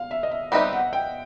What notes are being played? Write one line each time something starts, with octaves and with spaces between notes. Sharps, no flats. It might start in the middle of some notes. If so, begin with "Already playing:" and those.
Already playing: F5
E5
D#5
E5
G3 C4 D#4 G4 B4 E5
F#5
G5